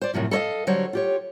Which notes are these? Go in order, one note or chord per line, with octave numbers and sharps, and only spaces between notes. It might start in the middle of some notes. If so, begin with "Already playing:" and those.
C5 D5
F#2 A2 C3 F3
A4 A#4 C#5 D#5 F5
D3 F#3 G3 C5 C#5
F4 G4 C#5